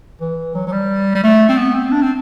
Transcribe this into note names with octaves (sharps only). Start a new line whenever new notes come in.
E3
F#3
F#3
G3
G3
A3
C4
B3
C4
D4
C4